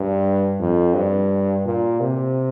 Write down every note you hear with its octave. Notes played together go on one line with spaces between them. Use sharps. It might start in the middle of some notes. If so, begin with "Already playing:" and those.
Already playing: G2
F2
G2
A#2
C3